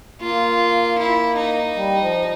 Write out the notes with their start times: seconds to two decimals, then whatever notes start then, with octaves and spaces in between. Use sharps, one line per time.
0.21 A#3 F4
0.98 E4
1.36 D#4
1.76 G3
2.00 F3